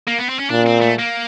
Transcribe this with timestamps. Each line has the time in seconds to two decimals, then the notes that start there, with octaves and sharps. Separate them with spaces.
0.07 A#3
0.18 B3
0.29 C4
0.39 C#4
0.50 A#2 D4
0.66 C4
0.82 A3
0.99 A#3